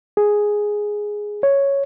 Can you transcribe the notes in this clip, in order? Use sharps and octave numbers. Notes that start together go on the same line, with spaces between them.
G#4
C#5